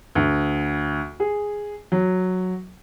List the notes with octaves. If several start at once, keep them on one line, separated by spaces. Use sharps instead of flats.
D2
G#4
F#3